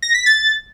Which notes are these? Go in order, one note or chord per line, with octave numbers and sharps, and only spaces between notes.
A#6
B6
A6